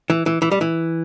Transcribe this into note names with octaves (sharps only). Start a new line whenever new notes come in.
E3
E3
E3
G3
E3